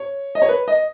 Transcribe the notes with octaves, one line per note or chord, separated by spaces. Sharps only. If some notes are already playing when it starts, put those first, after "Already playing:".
Already playing: C#5
D#5
C#5
B4
D#5